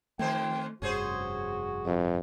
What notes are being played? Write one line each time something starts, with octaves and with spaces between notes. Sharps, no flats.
F2 D#3 A3 C5 G5
F1 G2 C#4 F#4 G#4 C5
F2